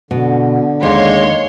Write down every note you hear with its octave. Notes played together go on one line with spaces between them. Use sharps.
B2 D3
D#2 G#3 C#5 C6